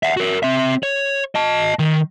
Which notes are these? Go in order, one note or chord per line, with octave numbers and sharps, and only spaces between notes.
E5 F#5
F#4 A#4
C4 E5
C#5
D#5 A5
D#3